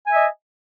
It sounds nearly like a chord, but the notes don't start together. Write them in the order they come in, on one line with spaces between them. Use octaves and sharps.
G#5 E5 D#5